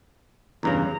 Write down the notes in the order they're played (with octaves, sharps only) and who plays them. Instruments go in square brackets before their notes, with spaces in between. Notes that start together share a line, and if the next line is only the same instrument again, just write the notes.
[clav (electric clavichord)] E2 G2 C#3 [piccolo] A#5